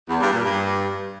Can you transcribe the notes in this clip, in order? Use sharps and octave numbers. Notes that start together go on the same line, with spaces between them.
E2
G2
A#2
G2